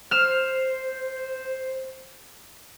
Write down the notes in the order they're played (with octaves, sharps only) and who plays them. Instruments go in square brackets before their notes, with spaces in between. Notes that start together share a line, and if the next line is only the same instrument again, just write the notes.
[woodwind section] C5 [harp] F6 E7